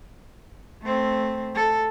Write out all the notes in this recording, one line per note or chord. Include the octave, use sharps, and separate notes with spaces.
A3 C4
A4